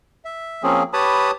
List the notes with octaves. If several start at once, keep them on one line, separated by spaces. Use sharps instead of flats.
E5
F3 A#3 C4 C#4 G#4
G4 B4 C#5 A5 B5 D#6